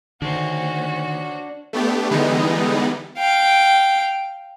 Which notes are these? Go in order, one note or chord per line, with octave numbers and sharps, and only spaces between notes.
D3 D#3 D4 F#4 C5 C#5
A3 B3 D4 G4
D3 E3 G3 G#3 B3 D#4
F5 G5